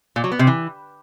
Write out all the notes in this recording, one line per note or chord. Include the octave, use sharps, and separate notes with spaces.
A#2
F#3
B3
C3
E3